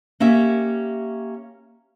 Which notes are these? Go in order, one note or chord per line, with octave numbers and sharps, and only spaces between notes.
A#3 C#4 G4 E5